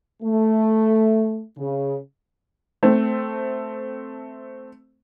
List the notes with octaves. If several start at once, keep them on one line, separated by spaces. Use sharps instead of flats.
A3
C#3
A3 C4